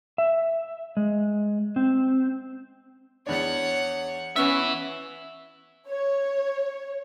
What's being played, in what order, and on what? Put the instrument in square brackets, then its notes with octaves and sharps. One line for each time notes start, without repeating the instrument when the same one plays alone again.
[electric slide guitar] E5
G#3
C4
[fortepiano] E2 D4 [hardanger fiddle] C#5 F#5
[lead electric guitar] E3 E5 [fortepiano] B3 B4 [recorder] C#4
[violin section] C#5